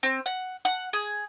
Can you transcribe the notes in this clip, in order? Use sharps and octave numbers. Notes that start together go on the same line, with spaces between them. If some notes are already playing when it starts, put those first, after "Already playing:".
C4
F#5
F#5
G#4